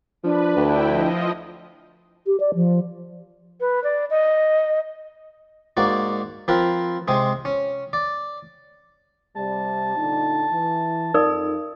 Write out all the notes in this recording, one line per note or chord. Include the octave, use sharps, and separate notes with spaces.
F3 D4 B4
D2 E4 G5
F3 D#5
G4
D5
F3
B4
D5
D#5
G#2 A#3 F#4 D5
F3 C4 A#4 B4
C3 G#3 C4 G#4
C#4
D5
C3 G3 A5
A#2 D3 D#4
E3
F2 D#4 A#4 D5 D#6